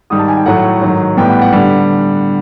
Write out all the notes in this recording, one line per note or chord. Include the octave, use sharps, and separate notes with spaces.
G#2 D#3 G3 D#6
A5
G#5
G5
A2 F#3 A3 F#5
G#2 D#3 F#3
A2 E3 G3 B3 G5
F#5
F#5
D3 G3